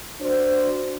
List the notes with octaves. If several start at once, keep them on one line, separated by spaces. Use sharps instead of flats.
D4 F#4 C5